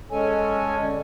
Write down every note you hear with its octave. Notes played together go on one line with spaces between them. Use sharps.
G#3 C#4 A4 C#5 G#5
D3